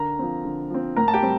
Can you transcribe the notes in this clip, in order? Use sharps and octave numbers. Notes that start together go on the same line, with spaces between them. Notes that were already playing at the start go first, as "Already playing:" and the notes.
Already playing: D3 A#4 A#5
F3 C4
D3
F3 C4
A2 A#4 A#5
A5
G4 G5
G3 C4